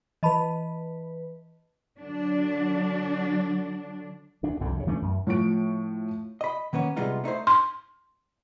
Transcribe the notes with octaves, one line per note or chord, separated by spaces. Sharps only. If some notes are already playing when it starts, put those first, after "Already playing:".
E3 B4 D#5 A5 B5
D3 F#3 D4
D2 D4
C2 F2 G#2 D3
D2 G2 C#3
E3 A3 C#4 D4
F#2
A2 F3 C#6 D7
D#5 B5
D#3 A#3 B3 C#4
C3 G3 G#3 B3 D#4 F4
A3 D#4 E4 C5
C6